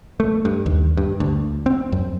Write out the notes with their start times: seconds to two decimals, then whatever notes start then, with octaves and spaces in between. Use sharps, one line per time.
0.20 A3
0.45 G2
0.66 D#2
0.97 G2
1.20 D2
1.66 C4
1.92 F#2